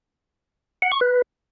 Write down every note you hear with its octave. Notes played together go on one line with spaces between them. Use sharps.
F#5
C#6
B4